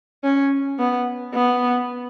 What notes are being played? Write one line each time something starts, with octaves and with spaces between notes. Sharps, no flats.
C#4
B3
B3